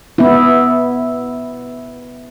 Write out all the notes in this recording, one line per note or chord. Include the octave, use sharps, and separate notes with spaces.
B3 E4